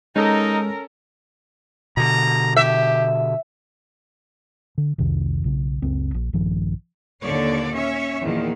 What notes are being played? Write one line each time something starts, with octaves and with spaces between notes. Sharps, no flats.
G#3 C#4 D#4 A4 A#4 A5 A#5
B2 D3 A#5
G4 E5
D3
C2 F2 C3 D#3
B1 C#3
F#1 C#2 C4
A#1
A#1 G2 D#3 F3
D#2 A#2 D3 C#5 D5
C#4 C#5 E5
E2 A#2 D#3 F3